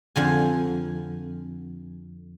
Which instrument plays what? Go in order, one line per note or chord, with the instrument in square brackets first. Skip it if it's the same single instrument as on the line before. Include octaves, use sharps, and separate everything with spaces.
[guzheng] F2 D3 G#5